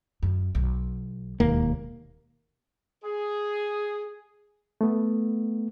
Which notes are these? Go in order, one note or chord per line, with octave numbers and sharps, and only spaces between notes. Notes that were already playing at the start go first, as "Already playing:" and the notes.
F#2
B1
E1 D#2 A#3
G#4
A3 B3